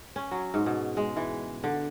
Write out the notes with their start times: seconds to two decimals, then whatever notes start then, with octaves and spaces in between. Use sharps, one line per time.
0.16 C#4
0.31 F#3
0.54 G#2
0.66 B2
0.97 G#3
1.16 E3
1.64 D3